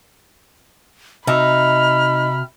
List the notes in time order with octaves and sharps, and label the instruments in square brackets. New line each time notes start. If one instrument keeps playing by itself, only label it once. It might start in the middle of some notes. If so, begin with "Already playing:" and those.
[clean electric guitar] C3 F#4 E5 [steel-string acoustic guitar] D#4 [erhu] B5 [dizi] F6